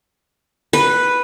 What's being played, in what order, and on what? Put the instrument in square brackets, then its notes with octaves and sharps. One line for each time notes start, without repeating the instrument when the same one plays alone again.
[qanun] B4